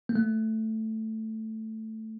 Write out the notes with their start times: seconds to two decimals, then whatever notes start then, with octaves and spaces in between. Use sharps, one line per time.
0.09 A#3
0.15 A3